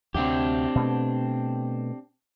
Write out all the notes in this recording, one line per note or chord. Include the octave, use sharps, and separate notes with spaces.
D2 C3 C4 D4 G4
B2 A3